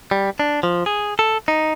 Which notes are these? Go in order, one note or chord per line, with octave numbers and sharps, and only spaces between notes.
G3
D4
F3
G#4
A4
D#4